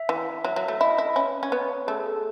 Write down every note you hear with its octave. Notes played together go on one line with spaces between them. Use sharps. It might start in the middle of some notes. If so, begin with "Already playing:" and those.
Already playing: E5
E3
F#3 E5
F#3
A3 E5
E4 D#5
E4
C#4 B4
C#4 C#5
B3 B4
A3 G#4
A4